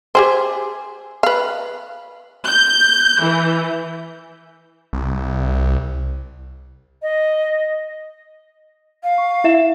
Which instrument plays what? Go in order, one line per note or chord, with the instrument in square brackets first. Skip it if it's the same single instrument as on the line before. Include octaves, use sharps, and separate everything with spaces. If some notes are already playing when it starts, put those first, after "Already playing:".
[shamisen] G4 G#4 C5
B4 F5
[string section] G6
E3
[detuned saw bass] C2
[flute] D#5
[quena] F5
[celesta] C#6
E4 E5 E7